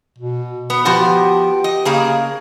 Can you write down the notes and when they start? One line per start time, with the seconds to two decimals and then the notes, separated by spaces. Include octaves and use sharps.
0.18 B2
0.70 B3
0.85 F3 B3 F#4 G4
1.64 D#5
1.85 C#3 A#3 G#4